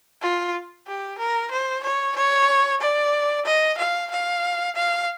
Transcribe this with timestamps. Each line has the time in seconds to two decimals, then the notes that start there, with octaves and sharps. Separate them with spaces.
0.22 F4
0.87 G4
1.19 A#4
1.52 C5
1.84 C#5
2.16 C#5
2.81 D5
3.46 D#5
3.78 F5
4.11 F5
4.76 F5